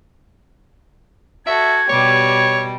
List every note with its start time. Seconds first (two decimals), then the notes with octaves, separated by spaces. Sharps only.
1.47 F#4 A4 E5 G#6
1.89 B2 G3 G4 C#5